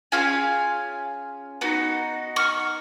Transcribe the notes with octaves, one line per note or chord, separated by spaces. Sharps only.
C#4 F4 G#4 F5 G#5
B3 D#4 F#4
C#6 F6